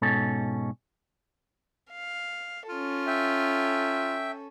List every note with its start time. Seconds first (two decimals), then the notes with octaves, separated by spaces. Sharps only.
0.02 G#2 B2 C#4 A4
1.91 F5
2.69 C#4 F4 A4
3.07 E5 G5